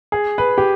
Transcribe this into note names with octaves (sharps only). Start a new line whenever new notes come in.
G#4
B4
G4